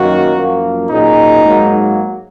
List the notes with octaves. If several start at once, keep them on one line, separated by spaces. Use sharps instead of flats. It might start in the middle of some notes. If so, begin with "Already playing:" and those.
Already playing: F#2 D#3 F#3 A#3 F#4
F#2 F3 A#3
A#2 F#3 C#4 D#4 G#4
G#2 F#3 A#3